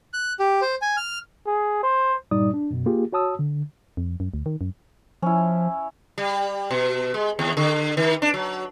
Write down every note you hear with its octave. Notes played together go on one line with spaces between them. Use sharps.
F#6
G4
C5
G#5
F6
G#4
C5
G2 A#2 G3 D#4 D5 D#6
D4
F#2 B2
A#3 F4 G4 G#4
F#4 C#5 A5 D#6 E6
D3
F2
F#2
D2
D#3
F#2
F3 C#4 E4
G3
B2
G#3
D#2
D3
D#3
D4
F#3